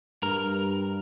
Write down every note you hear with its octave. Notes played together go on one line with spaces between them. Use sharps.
G2 A#4